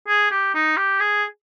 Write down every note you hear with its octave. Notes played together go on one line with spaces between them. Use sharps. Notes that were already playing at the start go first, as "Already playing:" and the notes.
G#4
G4
D#4
G4
G#4